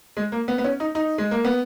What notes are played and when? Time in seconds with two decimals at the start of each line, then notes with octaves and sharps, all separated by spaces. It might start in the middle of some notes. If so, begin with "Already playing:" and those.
0.17 G#3
0.32 A#3
0.48 B3
0.58 B3
0.64 C#4
0.80 D#4
0.95 D#4
1.18 G#3
1.31 A#3
1.45 B3